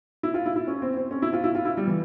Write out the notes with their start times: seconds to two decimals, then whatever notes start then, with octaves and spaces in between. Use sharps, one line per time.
0.23 E4
0.34 F4
0.46 E4
0.56 E4
0.67 C#4
0.82 C4
0.96 C4
1.11 C#4
1.22 E4
1.33 F4
1.44 E4
1.55 F4
1.65 E4
1.77 G3
1.87 E3